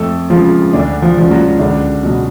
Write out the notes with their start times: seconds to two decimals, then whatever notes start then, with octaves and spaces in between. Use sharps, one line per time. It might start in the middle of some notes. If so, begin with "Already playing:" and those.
Already playing: F2 A3 A4
0.30 C#3 F3 G#3 F4
0.73 D2 D3 D4
1.02 F3 F4
1.17 C#3 F3 G#3
1.31 F#3 F#4
1.60 C#2 D3 D4
2.03 B2 F#3